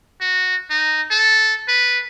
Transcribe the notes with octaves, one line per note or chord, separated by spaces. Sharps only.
F#4
D#4
A4
B4